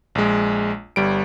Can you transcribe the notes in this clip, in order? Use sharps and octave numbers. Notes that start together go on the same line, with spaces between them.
A#1 G#3
G1 G3 D7